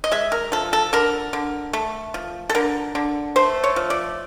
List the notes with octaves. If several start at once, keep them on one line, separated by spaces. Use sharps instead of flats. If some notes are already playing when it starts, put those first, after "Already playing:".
D#5
G#3 E5
A#4
F3 A4
A4
D3 A#4
D3
A3
F3
A4
D3 A#4
D3
A3 C5
C#5
F3
D5